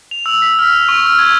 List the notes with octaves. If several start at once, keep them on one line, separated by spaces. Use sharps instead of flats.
F7
E6
B6
F6
F7
C#6
F6
G#6